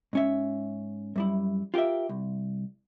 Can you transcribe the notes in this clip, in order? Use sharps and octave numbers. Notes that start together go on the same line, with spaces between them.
G#2 C#4 E5
F#2 G3 E4
F4 G4 G#4 A#4 E5
C2